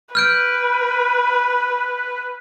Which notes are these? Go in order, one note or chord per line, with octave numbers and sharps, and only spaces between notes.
B4 F6 G6 D7